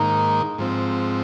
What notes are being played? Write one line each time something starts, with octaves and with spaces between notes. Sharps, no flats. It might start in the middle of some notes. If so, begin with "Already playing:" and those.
Already playing: G#2 D#3 A#3 D#4 A#5
G#2 F3 C4